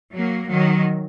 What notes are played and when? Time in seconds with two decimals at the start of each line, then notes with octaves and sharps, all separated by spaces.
0.13 F#3 A#3
0.47 D#3 F#3